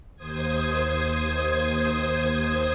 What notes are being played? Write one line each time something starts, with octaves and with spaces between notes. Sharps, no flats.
D#2 C5 D#6 G#6